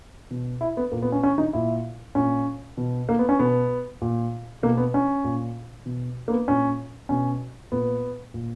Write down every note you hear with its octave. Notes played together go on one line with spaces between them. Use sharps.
B2
E4
B3
A#2 A#3
B3
C#4
C#4
D#4
A#2 E4
A#2 C#4
B2
A#3
B3
C#4
B2 B3
A#2
B2 A#3
B3
C#4
A#2
B2
A#3
B3
A#2 C#4
B2 C#4
A#2 B3
A#2